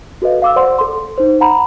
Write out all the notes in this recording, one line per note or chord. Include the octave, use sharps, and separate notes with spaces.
F#4 A4 B4 D#5 F5
F5 D6 E6
C5 D5 F#5 C6
A4 C6
D#4 C5
F#5 A#5 B5